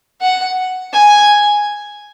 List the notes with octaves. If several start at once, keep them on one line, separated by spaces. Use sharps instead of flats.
F#5
G#5